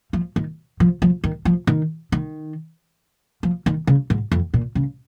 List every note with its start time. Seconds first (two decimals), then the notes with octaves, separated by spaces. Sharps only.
0.13 F3
0.36 D#3
0.80 F3
1.02 F3
1.24 D#3
1.45 F3
1.67 D#3
2.12 D#3
3.43 F3
3.66 D#3
3.87 C#3
4.10 G#2
4.32 F2
4.54 A#2
4.75 C#3